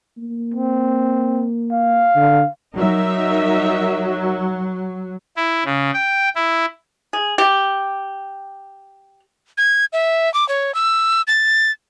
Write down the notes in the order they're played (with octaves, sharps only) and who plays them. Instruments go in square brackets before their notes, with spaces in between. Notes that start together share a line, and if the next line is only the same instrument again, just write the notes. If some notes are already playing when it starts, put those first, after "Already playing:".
[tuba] A#3
[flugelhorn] C4
F5
[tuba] D3
[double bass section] F#3 [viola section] D#4 A#4 E5
[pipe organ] E4
C#3
G5
E4
[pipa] G#4
G4
[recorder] G#6
E5
D6
C#5
E6
A6